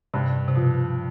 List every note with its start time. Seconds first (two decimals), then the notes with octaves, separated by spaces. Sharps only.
0.14 G2 C3
0.48 C3
0.56 B2 F3